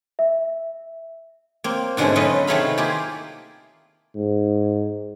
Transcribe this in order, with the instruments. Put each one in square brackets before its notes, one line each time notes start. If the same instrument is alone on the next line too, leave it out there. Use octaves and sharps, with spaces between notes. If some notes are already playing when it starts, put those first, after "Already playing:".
[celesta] E5
[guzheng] A#3 C4
G#2 B2 D3 G#3 A3 C#4
F#3 A3 F4 A4 B4 D#5
C3 D#3 A3 G#4 F5 B5
A#3 E4 F4 G4 G#4
[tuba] G#2